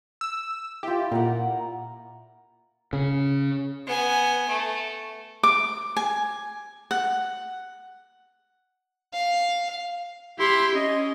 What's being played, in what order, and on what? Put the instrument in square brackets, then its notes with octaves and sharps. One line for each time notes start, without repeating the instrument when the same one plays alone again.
[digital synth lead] E6
[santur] E4 F4 [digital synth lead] G4
[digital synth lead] A#2 [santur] A#4 F#5
[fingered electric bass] C#3
[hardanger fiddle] B3 G#5
A3
[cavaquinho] D6
G#5
F#5
[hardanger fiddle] F5
[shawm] E4 [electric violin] G4 C6
[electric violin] C#4 [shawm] D#5